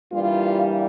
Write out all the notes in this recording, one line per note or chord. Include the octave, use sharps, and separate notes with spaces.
G2 E3 G3 A#3 F4